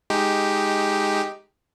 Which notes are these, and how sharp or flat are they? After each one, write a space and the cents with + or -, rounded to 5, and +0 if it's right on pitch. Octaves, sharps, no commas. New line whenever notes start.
G#3 +5 D#4 +0 G4 +0